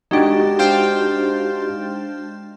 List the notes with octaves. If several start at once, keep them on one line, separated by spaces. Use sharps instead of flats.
G#3 D4 D#4 F#4 G4 A6
C5 F5 G5